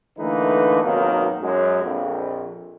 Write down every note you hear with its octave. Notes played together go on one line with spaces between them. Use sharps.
D3 E3 A3 A#3 D#4 B4
G#1 F#2 B2 D#3 A#3
F#2 G#3
A#1 F2